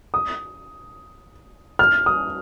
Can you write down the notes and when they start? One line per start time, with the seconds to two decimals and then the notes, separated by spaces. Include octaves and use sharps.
0.14 D#6
1.79 F6
2.06 D#6